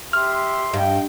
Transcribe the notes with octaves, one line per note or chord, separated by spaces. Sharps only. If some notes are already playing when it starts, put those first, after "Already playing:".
G4 E5 C6 F6
G2 D#5 G5